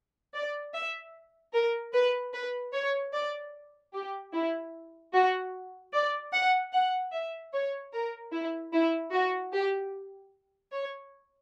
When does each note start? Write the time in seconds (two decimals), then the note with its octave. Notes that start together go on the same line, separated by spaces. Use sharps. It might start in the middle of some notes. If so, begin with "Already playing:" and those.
0.33 D5
0.73 E5
1.53 A#4
1.93 B4
2.33 B4
2.73 C#5
3.13 D5
3.93 G4
4.33 E4
5.13 F#4
5.93 D5
6.33 F#5
6.72 F#5
7.12 E5
7.53 C#5
7.93 A#4
8.32 E4
8.73 E4
9.13 F#4
9.53 G4
10.72 C#5